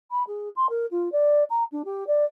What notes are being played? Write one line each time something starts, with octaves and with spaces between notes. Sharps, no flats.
B5
G#4
C6
A#4
F4
D5
A#5
D4
G4
D5